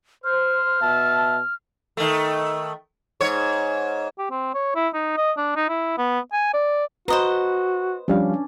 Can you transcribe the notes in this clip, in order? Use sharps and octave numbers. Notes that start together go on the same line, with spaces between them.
C5 F6
B2 E5 A5
D#3 A3
G#2 C#5
G4
C4
C#5
E4
D#4
D#5
D4
D#4
E4
B3
G#5
D5
F#4 B4 C5 D#5 A#5
F3 G3 C#4 D4 F5